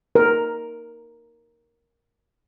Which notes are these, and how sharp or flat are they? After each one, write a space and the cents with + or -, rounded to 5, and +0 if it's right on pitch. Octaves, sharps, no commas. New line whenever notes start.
A#4 +5